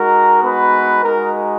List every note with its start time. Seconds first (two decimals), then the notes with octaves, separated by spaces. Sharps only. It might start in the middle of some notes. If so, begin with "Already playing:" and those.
Already playing: G#3 D#4 F#4 A#4 A#5
0.44 B3 B4
1.03 G#3 D#4 F#4 A#4